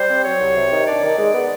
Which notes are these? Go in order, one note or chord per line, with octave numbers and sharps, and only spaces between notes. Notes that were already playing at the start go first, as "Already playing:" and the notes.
Already playing: G3 C5
C4
F#3 C#5
C2
C3
D#3
D4 D5
D#3
G#3
B3